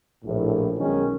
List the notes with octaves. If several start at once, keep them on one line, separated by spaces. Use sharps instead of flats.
A#1 A2
B1 D#3 G#3 C#4